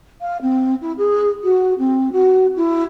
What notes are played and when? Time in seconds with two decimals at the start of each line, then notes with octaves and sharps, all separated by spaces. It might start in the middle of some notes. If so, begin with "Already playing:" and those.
0.21 F5
0.42 C4
0.81 E4
0.98 G#4
1.43 F#4
1.79 C4
2.12 F#4
2.56 E4